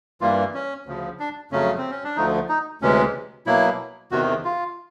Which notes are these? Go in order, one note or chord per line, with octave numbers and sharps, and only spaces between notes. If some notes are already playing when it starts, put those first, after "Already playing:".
G2 E3 G3 A#3 F4
C#4
D2 C#3 F3
D4
F2 C#3 F#3 A3 C#4
C4
C#4
D4
D2 D3 F3 A3 D#4
D#4
D2 C3 E3 G#3 C#4
B2 F#3 A#3 E4
E2 C3 D#3 F#4
F4